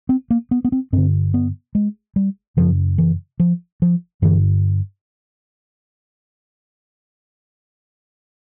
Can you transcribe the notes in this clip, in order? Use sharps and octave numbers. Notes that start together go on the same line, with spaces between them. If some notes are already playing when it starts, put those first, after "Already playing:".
C4
A#3
B3
B3
C4
G2 D3 C4
B3
G#3
G3
F#2 C#3 F3
E3
F3
F3
G2 D3 E3